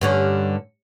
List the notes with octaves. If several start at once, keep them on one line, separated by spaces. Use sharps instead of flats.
G2 D3 C#4